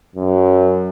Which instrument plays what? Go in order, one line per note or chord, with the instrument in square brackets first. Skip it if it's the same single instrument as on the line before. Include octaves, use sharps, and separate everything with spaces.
[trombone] F#2